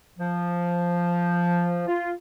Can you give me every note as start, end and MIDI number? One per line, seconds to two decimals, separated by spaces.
0.19 1.82 53
1.87 2.11 65